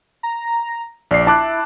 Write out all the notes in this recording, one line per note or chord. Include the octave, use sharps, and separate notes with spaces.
A#5
A#1 D5 C7
E4 A5 D6 F#6